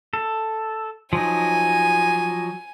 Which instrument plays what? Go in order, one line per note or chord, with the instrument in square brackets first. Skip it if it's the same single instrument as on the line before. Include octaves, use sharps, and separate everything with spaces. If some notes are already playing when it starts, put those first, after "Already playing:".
[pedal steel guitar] A4
[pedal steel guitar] F3 F#3 D#4 [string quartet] G#5